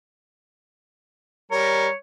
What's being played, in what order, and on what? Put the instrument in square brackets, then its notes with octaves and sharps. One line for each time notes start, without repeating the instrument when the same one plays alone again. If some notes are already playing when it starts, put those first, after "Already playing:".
[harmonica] G3 A#4 [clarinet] C#5